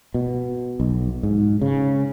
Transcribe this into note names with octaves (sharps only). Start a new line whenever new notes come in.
B2
B1
G#2
C#3